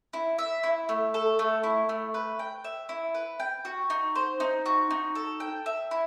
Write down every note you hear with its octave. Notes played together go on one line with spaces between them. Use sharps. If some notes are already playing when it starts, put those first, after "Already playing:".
E4
E5
E4
A3
A4
A3
E4
A3
B4
G5
E5
E4
B4
G5
F#4
D#4
C5
D#4
F#4
D#4
A4
G5
E5
E4